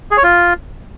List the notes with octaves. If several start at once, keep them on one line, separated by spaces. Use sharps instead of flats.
G#4
C#5
F4